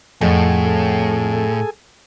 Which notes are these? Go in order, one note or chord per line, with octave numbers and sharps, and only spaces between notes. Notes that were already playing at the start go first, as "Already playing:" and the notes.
F2 A2 G#4 A4 F#5 G#5